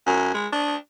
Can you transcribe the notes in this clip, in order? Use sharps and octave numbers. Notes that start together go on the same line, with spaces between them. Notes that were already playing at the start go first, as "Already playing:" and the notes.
F#2
G#3
D4